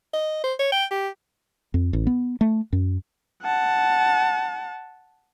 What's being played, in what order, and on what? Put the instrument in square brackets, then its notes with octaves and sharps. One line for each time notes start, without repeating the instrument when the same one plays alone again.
[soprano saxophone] D#5
C5
C#5
G5
G4
[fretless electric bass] F2
A1
B3
A3
F#2
[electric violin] F#5 A5